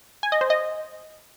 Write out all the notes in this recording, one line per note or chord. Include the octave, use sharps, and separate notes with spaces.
G#5
D#5
C5
D#5